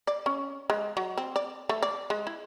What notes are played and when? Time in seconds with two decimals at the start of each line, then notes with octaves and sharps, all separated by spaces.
0.07 D5
0.26 C#4
0.70 G#3
0.97 F#3
1.17 C4
1.36 D5
1.69 A3
1.82 D5
2.10 G#3
2.27 E4